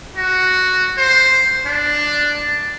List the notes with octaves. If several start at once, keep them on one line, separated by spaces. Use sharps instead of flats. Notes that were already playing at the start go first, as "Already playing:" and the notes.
F#4
C5
D4